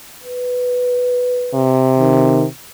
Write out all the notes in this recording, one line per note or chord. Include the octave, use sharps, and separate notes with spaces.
B4
C3
D#3